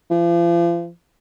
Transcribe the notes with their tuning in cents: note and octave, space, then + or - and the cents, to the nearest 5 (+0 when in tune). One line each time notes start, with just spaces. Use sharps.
F3 -40